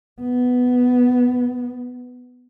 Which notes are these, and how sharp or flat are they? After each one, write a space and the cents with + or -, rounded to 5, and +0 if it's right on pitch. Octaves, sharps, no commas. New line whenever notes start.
B3 +5